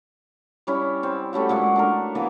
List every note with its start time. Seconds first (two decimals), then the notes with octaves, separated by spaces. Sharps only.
0.67 G3 C#4 E4
1.03 C4
1.33 G3 A3 C#4 F#4
1.49 A#2 G#3 F#5
1.76 A3 D4 A#4
2.15 E3 A#3 B3 D#5